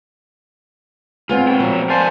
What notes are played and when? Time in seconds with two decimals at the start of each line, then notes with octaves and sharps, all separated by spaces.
1.29 G#3 B3 C4 F4
1.47 A#2 G5
1.60 F3 F#3
1.90 A#4 C5 D5 F5 G#5 A5